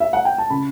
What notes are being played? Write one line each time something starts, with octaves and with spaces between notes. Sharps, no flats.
E5
F#5
G5
A5
C#3 B5